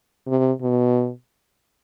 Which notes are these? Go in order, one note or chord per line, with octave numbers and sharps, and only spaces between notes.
C3
B2